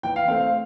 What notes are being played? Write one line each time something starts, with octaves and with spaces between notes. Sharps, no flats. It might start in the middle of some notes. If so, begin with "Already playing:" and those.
E3 G5
F5
A3 C4 F5
F5